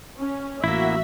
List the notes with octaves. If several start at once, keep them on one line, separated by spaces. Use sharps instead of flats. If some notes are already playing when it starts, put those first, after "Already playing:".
C#4
A1 A#3 E4 F#4 E5